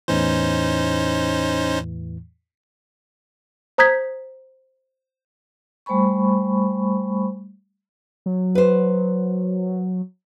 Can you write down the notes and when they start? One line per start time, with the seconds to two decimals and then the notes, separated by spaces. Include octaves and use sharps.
0.08 E2 A2 E3 C#4 D#4 C5
3.78 C5 A#5 D#6 G6 G#6 B6
5.86 G3 A3 C5 G#5 B5 C#6
8.26 F#3
8.55 B4 C5